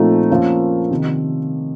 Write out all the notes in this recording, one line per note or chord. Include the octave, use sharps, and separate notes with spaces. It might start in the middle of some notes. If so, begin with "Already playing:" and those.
Already playing: A#2 F3 A3 C4 D#4
F3 A#3 C#4 F4 A#4
C3 D#3